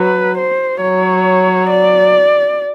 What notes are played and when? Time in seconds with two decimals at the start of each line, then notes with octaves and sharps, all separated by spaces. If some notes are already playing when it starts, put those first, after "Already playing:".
Already playing: F#3 B4
0.38 C5
0.82 F#3 C#5
1.70 D5